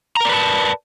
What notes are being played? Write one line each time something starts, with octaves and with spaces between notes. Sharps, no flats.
A#4 B4 D5 A5 A#5